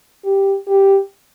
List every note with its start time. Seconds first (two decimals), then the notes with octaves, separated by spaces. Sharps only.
0.24 G4
0.68 G4